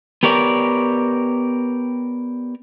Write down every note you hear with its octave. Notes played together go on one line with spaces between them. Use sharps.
B3 G4 A#4 C#5 D5